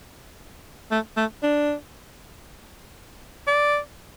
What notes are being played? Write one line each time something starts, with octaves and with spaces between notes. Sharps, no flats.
A3
A3
D4
D5